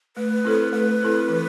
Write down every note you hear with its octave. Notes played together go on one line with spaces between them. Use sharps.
A3 B4
C4 E4 A4 C5
A3 B4
C4 E4 A4 C5
E3